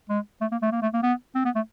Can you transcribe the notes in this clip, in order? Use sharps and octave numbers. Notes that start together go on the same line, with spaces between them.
G#3
A3
A#3
A3
A#3
A3
A#3
B3
C4
B3
A3